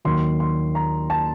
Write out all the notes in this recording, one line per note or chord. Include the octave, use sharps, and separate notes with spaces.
D#2 D#3 F#3 C6
C6
A#5
A5